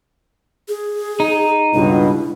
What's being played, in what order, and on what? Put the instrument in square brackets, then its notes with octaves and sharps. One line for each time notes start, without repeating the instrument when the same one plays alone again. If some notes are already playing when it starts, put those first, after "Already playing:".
[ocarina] G#4
[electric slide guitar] D#4
[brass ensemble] C#2 G2 B2 [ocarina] E4